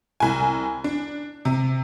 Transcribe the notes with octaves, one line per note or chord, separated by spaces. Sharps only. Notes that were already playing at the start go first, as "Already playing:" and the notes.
C2 G#5
D4
C3